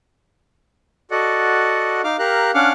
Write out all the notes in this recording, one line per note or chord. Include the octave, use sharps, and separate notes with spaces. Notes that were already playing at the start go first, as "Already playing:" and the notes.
F#4 A4 D5 D#5 F#5
D#4 F5 D6 F6
G4 A#4 F5 A#5 F#6
C#4 D4 F5 F#5 D6 F6